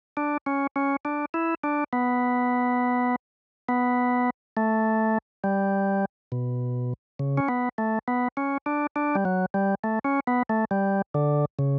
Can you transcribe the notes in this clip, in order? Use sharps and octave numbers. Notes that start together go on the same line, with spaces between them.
D4
C#4
C#4
D4
E4
D4
B3
B3
A3
G3
B2
C#3
C#4
B3
A3
B3
C#4
D4
D4
G3
F#3
G3
A3
C#4
B3
A3
G3
D3
C#3